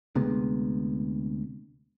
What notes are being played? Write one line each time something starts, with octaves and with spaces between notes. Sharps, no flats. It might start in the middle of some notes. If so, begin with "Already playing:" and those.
D2 C3 G#3 B3